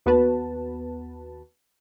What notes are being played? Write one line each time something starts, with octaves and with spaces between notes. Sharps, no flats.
D#2 B3 F#4 B4 A5